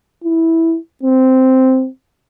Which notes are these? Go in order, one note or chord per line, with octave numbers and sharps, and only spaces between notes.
E4
C4